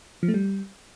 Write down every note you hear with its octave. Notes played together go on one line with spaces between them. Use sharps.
F3
A3
G3